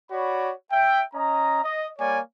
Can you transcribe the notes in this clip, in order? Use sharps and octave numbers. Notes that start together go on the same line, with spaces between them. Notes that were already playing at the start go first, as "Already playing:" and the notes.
F#4 C#5 D5 B5
E5 G5
C#4 D#5 A#5
D#5
G3 A#3 C#5 D5 G#5